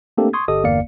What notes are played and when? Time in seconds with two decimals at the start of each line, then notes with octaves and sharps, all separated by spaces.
0.18 A3 A#3 C4 D4 G4 A4
0.33 C6 C#6 D#6 G#6
0.48 G1 G4 A4 D#5 D#6
0.64 G1 E2 A#3 D5 F5 C#7